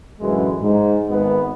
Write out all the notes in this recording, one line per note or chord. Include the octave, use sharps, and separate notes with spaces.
A1 F#2 D3 E3 G#3
G#2
G#1 G#3 B3